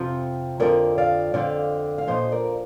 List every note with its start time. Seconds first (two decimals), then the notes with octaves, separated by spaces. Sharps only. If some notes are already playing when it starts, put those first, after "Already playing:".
Already playing: F2 C3 F3 C5
0.60 F2 D3 F3 A#4 D5
0.98 D5 F5
1.34 F2 D3 F3 D5 F5
1.98 F5
2.08 A#2 F3 C5 D#5
2.32 A#4 D5